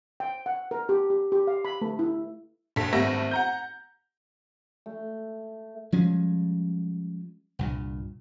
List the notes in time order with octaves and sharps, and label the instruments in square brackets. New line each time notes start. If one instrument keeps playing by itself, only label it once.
[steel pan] G5
F#5
A#4
G4
G4
G4
F5
B5
A3
E4
[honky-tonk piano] A#1 A4 B6
G#1 G3 A3 B3 E5 A#6
F#5 A#5 G6
[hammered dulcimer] A3
[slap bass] F3 G3 G#3 C#4
C2 G2 A#2